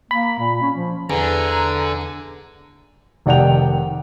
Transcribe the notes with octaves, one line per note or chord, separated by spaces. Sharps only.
A#3 B5
A#2
C#4
F3
E2 D3 G#5 A#5
F1 D#3 D5 F#5 G5 F7